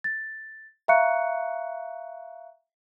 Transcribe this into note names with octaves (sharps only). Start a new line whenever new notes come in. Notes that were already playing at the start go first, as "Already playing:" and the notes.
A6
E5 F5 A#5 C#6 F#6 C#7